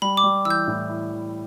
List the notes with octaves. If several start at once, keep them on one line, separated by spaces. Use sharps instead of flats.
G3 B5
D6
G3
E3 E6
G6
A2
E4
E3